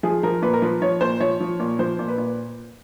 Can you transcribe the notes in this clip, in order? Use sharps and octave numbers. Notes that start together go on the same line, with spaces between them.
F3 G#4
F3 A#4
A#2 B4
A#4
F3 B4
F3 C#5
A#2 C5
F3 C#5
F3
A#2
F3 C5
A#2
B4
A#2